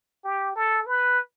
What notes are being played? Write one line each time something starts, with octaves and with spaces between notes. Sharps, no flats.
G4
A4
B4